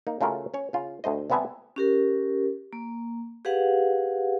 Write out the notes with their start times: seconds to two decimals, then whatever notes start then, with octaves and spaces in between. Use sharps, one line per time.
0.07 A#3 D#4
0.21 C#3 A3 F4 F#4 A#4
0.54 C#4 C#5
0.73 C#3 F4
1.04 D2 A3 C5 D#5
1.30 C3 G3 B3 E5 G#5 A5
1.76 C#4 G4 A#4
2.73 A#3
3.45 G4 G#4 B4 F5 F#5